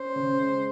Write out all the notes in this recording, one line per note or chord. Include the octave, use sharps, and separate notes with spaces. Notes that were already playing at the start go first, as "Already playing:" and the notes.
Already playing: C#4 C5
C#3
G#3